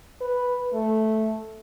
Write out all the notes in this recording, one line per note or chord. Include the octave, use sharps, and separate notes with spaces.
B4
A3